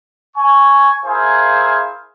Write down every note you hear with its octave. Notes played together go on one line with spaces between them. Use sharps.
G#5 C#6
E4 G#4 A#4 C5 F5 G#5